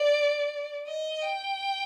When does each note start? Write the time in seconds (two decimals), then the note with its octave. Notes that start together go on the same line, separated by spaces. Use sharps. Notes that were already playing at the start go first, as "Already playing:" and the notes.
Already playing: D5
0.87 D#5
1.22 G5